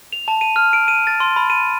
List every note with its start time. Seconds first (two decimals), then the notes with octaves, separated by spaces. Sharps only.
0.12 F7
0.28 A5
0.41 D#7
0.56 F6
0.73 D7
0.88 D#7
1.07 A6
1.20 C6
1.36 B5
1.50 D#7